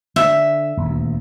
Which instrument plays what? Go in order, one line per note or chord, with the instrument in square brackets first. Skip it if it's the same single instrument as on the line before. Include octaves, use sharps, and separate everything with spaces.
[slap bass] D3 [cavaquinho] E5
[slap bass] D#1 D2